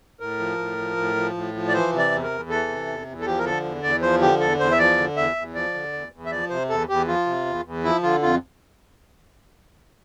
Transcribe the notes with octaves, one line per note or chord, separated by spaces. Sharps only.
A2 A#4
F3
A2
F3
A2
F3
A2
F3
D5
E3 C5
C3
D5
E2
A#4
E2
E3 A4
C3
E2
E2
A4
F3 G4
A#4
D3 A4
E2
E2 D5
F3 C5
D3 G4
E2 A4
E2 C5
E5
F3 D5
D3
E2 E5
E2
F3 D5
D3
E2
E2
E5
F3 D5
C3 C5
E2 A4
E2 G4
F3 F4
C3
E2
E2
F3 E4
D3 F4
F2 F4